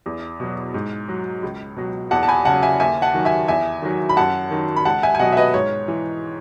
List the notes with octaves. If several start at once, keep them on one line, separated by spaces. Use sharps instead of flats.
E2
B2 F#3
G#2
F#3
C#2
B2 F#3
E2 F#5 A5
A5
G#5 B5
C#3 F#3 F#5 A5
E5 G#5
D#2 E5 G#5
F#5 A5
D#3 F#3
E5 G#5
E2 E5 G#5
D#3 F#3
B5
F#2 F#5 A5
D#3 F#3
B5
C#2 F#5 A5
E5 G#5
G#5
B2 F#3 D#5 F#5
E5
B4 D#5
G#2 C#5
E3